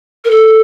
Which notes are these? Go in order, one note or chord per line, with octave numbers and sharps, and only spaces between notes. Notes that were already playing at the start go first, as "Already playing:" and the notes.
A#4
A4